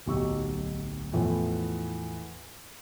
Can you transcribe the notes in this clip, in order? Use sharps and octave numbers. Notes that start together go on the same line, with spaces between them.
D1 B1 D#4 G4 C#6 E6
E2 A2 F3